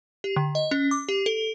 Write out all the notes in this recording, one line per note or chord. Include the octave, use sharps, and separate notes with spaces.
G4
D3
D#5
C#4
D6
G4
A4